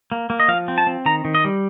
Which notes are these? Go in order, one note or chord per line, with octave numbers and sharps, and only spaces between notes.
A#3
A#3
D#5
F3 F5
C4
A5
C4
D#3 A#5
D#3
D#5
G3